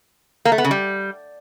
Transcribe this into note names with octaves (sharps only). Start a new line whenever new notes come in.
A#3
A3
B3
C#3
G3